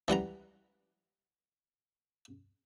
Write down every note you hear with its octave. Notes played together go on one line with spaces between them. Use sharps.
E3 G3 F#5 A#5